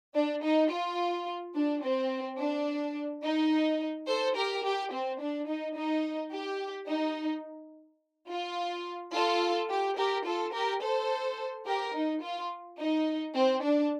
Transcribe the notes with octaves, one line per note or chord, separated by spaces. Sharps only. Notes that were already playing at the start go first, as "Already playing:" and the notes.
D4
D#4
F4
D4
C4
D4
D#4
A4 C5
G4 A#4
G4
C4
D4
D#4
D#4
G4
D#4
F4
F4 A4
G4
G4 A#4
F4 A4
G4 A#4
A4 C5
G4 A#4
D#4
F4
D#4
C4
D4